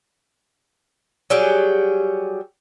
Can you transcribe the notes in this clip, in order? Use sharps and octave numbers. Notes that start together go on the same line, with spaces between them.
F#3 G3 G4 G#4